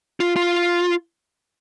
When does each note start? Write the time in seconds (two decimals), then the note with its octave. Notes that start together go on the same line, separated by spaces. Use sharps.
0.20 F4
0.36 F4